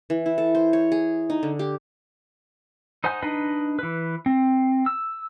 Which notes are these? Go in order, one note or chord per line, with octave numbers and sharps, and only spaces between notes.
E3
E4
A4
C5
C#5
G#4
D#4
D3
G4
D#4 C5 F#5 G#5 G6
D4 D#4 B4 D#5
E3 B4
C4
E6